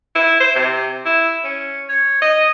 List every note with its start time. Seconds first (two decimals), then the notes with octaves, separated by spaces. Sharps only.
0.15 E4
0.40 C5
0.56 C3
1.06 E4
1.44 C#4
1.89 C#5
2.22 D#5